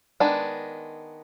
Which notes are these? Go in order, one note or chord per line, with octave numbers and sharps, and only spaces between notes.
D#3 G#3 B3 D4